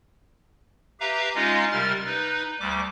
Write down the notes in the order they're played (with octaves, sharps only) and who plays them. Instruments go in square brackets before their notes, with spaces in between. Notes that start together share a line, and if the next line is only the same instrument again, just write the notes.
[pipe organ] G4 B4 E5 F5 A#5
G#3 C#4 D#4 F4 D#5 F5
C3 G3 A#4 F6 A6
D#4 B4
D2 G3 D6